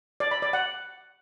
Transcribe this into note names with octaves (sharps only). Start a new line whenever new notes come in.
D5
B5
D5
F#5